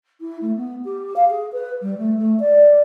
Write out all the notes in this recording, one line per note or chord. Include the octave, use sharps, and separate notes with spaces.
E4
A3
B3
G4
F5
G#4
B4
G3
A3
A3
D5